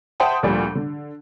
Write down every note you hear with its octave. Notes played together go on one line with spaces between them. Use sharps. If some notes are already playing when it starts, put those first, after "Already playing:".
C5 E5 F#5 G5 A5 D#6
D2 A#2 F3 G3
D3